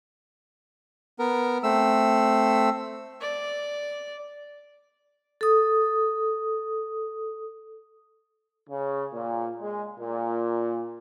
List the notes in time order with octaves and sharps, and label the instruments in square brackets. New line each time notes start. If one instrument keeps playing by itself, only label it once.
[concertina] B3 A#4
A3 C4 E6
[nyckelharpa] D5
[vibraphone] A4 D#6
[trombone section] C#3
A#2
G#3
A#2